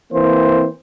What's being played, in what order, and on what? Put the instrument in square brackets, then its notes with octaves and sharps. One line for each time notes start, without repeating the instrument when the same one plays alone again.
[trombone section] E3 A#3 C4 C5